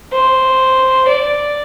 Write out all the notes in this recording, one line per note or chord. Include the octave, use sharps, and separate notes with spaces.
C5
D5